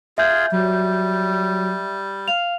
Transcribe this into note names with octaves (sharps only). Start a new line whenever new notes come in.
F4 G#4 E5 G6
F#3 G3
F5 F7